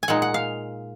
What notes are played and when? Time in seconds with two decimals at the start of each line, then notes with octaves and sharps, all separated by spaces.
0.03 G#5
0.08 A#2 G#3 D#4 F#5
0.22 F#5
0.34 F5